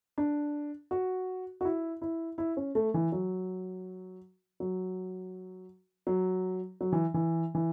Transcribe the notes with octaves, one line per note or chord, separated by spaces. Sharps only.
D4
F#4
F#4
E4
E4
E4
C#4
A3
E3
F#3
F#3
F#3
F#3
E3
E3
E3